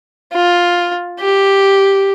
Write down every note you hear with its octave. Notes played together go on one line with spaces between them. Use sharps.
F4
G4